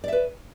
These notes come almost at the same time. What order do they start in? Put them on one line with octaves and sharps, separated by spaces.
D5 E5 B4